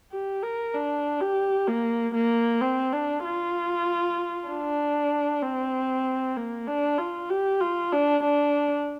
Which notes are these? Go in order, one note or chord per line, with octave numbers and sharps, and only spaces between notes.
G4
A#4
D4
G4
A#3
A#3
C4
D4
F4
D4
C4
A#3
D4
F4
G4
F4
D4
D4